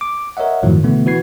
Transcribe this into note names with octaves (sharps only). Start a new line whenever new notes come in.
D6
A#4 C#5 D#5 E5 F#5
F#2 A2 D#3 F3 F#3
B2 D3 E3 A3 B3
E3 F#4 B4 G#6 C7